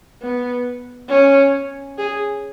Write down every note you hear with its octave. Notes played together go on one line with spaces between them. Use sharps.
B3
C#4
G#4